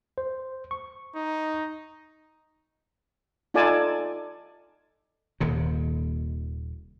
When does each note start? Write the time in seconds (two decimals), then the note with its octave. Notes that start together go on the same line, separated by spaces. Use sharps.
0.18 C5
0.71 C#6
1.15 D#4
3.54 D#4 F4 A4 D5 G#5 A5
5.40 D#1 D#2 C3